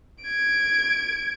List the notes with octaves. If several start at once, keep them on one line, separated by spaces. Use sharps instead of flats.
G#6 D7